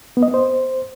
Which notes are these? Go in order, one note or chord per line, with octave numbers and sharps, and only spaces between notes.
B3
D#5
B3
C5